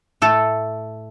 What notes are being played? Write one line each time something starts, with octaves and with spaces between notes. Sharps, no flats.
A2 A3 A4